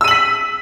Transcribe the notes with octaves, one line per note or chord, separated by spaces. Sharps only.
E6 B6 D#7 F#7